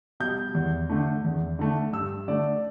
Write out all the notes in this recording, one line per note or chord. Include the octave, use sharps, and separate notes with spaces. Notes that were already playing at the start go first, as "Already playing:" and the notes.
B2 G3 G6
E2
D3 A3
E2
D3 A3
G2 E6
D3 A3 D5